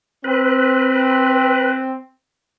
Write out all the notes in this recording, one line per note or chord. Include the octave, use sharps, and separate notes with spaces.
C4 B4